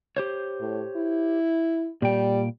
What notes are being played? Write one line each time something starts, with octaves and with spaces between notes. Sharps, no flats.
G4 C5 C#5
A2
E4
A#2 G3 G5